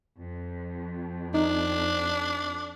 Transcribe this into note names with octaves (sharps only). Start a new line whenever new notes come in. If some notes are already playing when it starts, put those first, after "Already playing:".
F2
D4 D#4